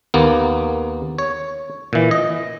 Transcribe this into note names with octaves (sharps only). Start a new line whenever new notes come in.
D#2 A#3 B3
C#5
A#2 E3
D#5